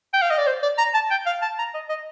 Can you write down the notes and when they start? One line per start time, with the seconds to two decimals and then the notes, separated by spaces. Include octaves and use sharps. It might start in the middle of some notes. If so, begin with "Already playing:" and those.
0.14 G5
0.22 F5
0.30 D#5
0.38 D5
0.47 C5
0.63 D5
0.78 A#5
0.94 A5
1.11 G5
1.26 F5
1.42 A5
1.59 A#5
1.74 D#5
1.89 D#5